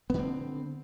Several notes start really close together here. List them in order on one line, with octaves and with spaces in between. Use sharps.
B3 D3 C4